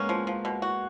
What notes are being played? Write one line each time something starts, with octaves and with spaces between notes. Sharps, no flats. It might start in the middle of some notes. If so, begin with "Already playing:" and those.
Already playing: G#3 A#3 B3 C#4
F3
F3
B2
F#4